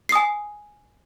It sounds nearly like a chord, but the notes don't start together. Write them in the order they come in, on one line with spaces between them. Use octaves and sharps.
C7 D#6 G#5